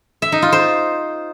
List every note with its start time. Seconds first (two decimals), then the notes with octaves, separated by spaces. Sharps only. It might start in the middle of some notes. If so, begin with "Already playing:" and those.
0.22 E5
0.32 D#4
0.42 F4
0.52 C5